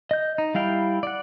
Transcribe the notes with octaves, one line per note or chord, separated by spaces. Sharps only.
D#5 G6
D#4
G3 E4 F5 G5
D5 F#5